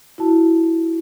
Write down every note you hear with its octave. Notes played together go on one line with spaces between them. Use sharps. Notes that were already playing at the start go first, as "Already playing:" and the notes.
E4 F#4 A5